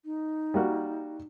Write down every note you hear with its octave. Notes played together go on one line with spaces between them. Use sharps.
D#4
G3 A#3 F#4